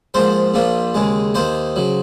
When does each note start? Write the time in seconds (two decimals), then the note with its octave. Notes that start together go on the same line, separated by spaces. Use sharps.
0.14 G#2 F3 A#3 C5
0.54 A#1 A#2 F3 A#3
0.94 D#2 C#3 G#3
1.34 D#2 D#3 A#3 C5
1.76 C#3 F#3